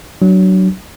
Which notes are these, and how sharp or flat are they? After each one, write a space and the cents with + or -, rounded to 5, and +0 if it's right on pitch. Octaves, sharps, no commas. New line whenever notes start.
F#3 +20 D4 +10